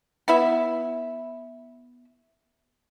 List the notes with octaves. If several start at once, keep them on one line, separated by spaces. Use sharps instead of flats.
B3 E4 E5